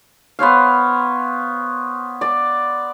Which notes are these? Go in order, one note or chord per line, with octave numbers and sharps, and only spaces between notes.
B3 C5 C#5 F5
D5